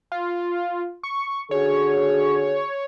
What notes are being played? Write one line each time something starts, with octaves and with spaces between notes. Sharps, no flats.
F4
C#6
D3 F#4 G#4 C#5